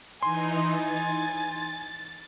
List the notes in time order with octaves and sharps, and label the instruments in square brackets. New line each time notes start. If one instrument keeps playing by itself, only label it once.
[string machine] E3 D#4 [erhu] G#5 [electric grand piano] C6
[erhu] G#5 [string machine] A6